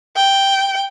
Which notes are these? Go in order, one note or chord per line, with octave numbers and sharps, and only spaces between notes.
G5